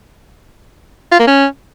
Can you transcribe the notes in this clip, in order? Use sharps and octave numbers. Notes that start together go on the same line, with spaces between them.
F4
A#3
C#4